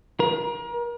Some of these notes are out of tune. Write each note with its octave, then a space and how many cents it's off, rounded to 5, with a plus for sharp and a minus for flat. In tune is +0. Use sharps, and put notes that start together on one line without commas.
A#4 +35